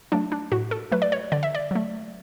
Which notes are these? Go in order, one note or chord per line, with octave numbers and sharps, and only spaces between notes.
F#3 A3 D4
D4
A2 F#4
A4
F#3 A3 B4
D5
C#5
D3 D5
E5
D5
F#3 A3